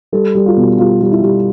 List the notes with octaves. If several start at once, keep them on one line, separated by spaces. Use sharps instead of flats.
G3 A4
G3
F4
B2
G3 F4
G3
E4
G3